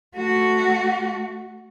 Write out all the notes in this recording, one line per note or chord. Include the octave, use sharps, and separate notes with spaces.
A3 F#4